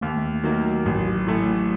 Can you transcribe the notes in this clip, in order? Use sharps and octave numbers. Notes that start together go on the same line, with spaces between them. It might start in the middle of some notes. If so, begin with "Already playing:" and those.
D#2 A3
A3
D#3 F#3 A#3
A1 F#3
A2 A3